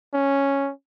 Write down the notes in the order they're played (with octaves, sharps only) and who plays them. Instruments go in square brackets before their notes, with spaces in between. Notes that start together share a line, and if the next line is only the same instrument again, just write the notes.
[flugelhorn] C#4